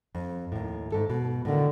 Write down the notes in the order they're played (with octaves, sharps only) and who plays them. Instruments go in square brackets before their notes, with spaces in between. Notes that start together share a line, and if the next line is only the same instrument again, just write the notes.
[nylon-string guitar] F2
D#2 A2
G#2 A4
B2
[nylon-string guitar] A2 D#3 [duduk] D3